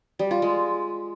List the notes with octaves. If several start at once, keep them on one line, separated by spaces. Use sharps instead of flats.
G3
F4
G#3